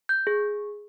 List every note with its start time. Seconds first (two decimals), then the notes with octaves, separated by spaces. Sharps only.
0.09 G6
0.27 G#4